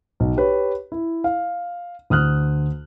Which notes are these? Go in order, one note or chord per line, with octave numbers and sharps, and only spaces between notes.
B1
G4 B4 C#5
E4
F5
D2 D#6 F6 F#6